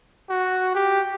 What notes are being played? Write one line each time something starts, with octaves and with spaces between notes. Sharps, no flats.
F#4
G4